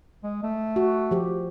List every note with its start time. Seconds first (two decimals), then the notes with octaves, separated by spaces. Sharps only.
0.23 G#3
0.43 A3
0.76 F#4
1.11 F3 G4